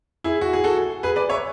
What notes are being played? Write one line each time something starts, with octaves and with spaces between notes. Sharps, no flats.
E4 G#4
F#4
G#4
F#4 A4
G#4 B4
B4 D5
C#5 E5